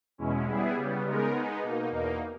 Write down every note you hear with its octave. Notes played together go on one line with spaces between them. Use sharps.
E2 B2 G#3 C#4 E4
G3 B3 E4 G#4
C#3 G3 B3
C#3 G#3 B3 D#4 A#4
G#3 B3 D#4
B2 A#3 D#4
E2 B2 A#3 D#4